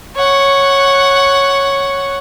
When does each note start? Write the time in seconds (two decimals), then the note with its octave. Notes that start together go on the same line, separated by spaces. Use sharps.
0.15 C#5 F#5